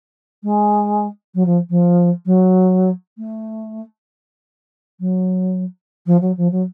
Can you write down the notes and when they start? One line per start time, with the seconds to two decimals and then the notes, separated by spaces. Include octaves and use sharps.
0.43 G#3
1.34 F#3
1.45 F3
1.69 F3
2.25 F#3
3.17 A3
4.99 F#3
6.06 F3
6.20 F#3
6.37 F3
6.51 F#3